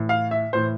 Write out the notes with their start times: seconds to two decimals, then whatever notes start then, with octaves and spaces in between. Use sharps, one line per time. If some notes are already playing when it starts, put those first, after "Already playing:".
Already playing: A2 E3
0.09 F5
0.31 E5
0.53 A2 E3 C5